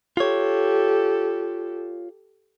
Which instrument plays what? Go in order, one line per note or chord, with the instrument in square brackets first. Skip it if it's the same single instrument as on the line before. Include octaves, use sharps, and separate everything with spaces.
[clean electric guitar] F4 C#5 [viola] G4 A4